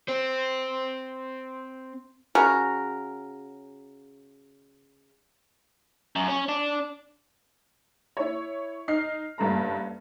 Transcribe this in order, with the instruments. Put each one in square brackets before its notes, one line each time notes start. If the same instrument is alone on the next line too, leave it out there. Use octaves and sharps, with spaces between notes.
[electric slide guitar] C4 C5
[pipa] C#3 F#4 A#4
[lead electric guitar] F#2
C#4
D4
[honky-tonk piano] E4 C#5
D#4 F6 C7
F#1 G2 A3 A#5